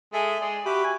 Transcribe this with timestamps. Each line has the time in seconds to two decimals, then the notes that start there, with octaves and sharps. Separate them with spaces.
0.13 G#3 A4 E5 G#5
0.41 G#3 D5
0.65 F#4 G4 E5 G5 B5
0.84 G#5